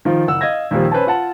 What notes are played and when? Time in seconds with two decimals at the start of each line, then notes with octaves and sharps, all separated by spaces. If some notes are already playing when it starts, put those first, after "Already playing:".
0.05 D#3 F3 F4
0.27 F#1 F#5 E6
0.41 D#5 F5 G#6 A#6
0.71 D#2 A#2 D#3 F3 G3
0.92 C#4 B4 C5 G#5 A5
1.07 F4 F#5 A5